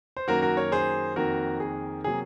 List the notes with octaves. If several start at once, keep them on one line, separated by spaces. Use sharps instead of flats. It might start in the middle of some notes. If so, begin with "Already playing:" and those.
C5
F#2 D#3 F#3 A#3 F#4 A#4
F#4 A#4
A#4 C#5
G#4 C5
F2 D#3 A#3 F#4 A#4
G#4
C3 F#3 A#3 G#4